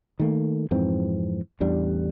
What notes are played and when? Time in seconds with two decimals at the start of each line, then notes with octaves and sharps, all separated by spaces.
0.20 D#3 A3 A#3
0.71 F2 G#2 E3 C4
1.60 A1 E2 G3 D4